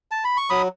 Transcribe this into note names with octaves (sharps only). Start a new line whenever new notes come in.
A5
B5
C#6
F#3 B5 D#6